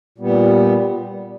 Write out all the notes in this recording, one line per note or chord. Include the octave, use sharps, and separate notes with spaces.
A#2 G3 B3